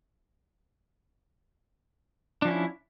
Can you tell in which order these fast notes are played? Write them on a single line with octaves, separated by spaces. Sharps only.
D4 F3 C#4 E4